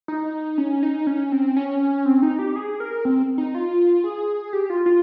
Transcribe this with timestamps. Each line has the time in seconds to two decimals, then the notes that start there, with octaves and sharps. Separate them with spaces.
0.08 D#4
0.58 C#4
0.83 D#4
1.07 C#4
1.32 C4
1.57 C#4
2.06 C4
2.22 D#4
2.39 G4
2.56 G#4
2.80 A#4
3.05 C4
3.38 D#4
3.55 F4
4.04 G#4
4.53 G4
4.70 F4
4.86 F4